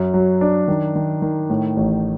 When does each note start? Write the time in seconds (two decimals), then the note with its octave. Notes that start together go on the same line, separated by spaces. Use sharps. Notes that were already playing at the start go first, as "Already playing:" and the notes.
Already playing: F#2
0.14 F#3
0.41 D4
0.68 D#3
0.96 D#3
1.22 D#3
1.50 A2
1.77 A1